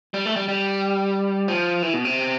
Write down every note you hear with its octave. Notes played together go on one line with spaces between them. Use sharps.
G3
A3
G3
G3
F3
E3
B2
C3